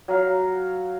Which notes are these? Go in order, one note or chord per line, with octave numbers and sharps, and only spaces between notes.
F#3 F5